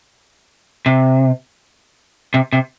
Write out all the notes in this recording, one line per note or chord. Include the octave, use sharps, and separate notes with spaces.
C3
C3
C3